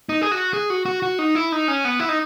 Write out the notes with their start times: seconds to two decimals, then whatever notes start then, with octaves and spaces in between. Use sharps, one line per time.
0.09 D#4
0.21 G#4
0.31 F#4
0.54 G#4
0.70 F#4
0.85 F#4
1.02 F#4
1.19 D#4
1.35 E4
1.52 D#4
1.68 C#4
1.85 B3
2.00 E4
2.09 D#4